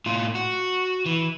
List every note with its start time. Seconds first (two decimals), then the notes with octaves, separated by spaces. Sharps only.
0.06 A2 F4
0.35 F#4
1.06 E3